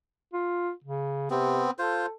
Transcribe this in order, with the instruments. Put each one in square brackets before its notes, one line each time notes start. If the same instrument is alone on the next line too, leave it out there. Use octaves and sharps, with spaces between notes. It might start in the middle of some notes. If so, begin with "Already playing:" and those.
[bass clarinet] F4
C#3
[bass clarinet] C3 [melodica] B3 C4
[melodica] F4 C5 [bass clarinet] A4